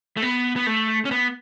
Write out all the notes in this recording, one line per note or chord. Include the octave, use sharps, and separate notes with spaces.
A3
B3
B3
A3
C#4
B3